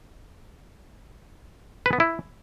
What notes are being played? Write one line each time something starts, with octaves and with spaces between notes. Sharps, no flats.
B4
B3
E4